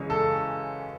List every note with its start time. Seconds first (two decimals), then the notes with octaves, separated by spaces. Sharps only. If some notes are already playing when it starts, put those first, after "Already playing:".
Already playing: F#2 C#3 E3 G#3 C#4
0.10 A4